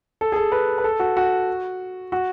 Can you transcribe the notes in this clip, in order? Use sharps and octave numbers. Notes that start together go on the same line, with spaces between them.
A4
G#4
A4
B4
B4
A4
F#4
F#4
F#4